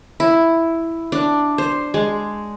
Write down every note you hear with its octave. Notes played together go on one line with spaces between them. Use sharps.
E4
D4
C5
G#3